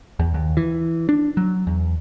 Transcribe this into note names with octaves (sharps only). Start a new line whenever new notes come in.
E2
D#2
E3
D4
F#3
E2